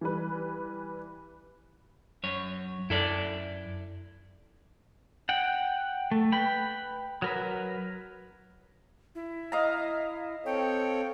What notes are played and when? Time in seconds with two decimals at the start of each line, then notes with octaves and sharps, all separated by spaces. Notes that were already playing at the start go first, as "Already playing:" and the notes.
0.01 E3 G3 B4
2.23 F#2 C#5
2.90 F#2 E4 A4 D5
5.29 F#5 G5
6.11 A3
6.32 B4 G5 B5
7.22 F#3 A#4 B4
9.15 E4
9.52 D#5 F5 A#5
10.46 C4 A4 C#5 G5